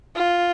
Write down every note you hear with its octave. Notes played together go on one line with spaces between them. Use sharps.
F4